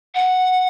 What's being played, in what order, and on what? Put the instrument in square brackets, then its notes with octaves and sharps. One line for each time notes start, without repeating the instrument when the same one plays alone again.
[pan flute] F#5